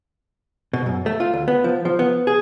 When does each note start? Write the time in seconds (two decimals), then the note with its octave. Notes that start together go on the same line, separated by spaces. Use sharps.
0.73 B2
0.86 F#2
1.06 A3
1.20 F4
1.34 D2
1.48 B3
1.64 F3
1.85 F3
1.99 B3
2.27 G#4